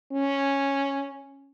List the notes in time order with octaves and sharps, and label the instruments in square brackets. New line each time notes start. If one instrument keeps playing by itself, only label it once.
[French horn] C#4